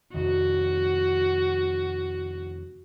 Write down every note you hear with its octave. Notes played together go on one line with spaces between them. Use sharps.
F2 C3 D#3 F#4